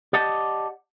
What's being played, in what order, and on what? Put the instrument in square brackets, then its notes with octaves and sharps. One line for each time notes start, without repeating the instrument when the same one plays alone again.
[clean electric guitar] G4 D5 D#5 F#5 A5